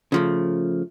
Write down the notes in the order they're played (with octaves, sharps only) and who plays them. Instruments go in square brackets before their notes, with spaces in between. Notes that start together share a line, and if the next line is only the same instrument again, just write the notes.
[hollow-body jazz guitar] C#3 F3 A3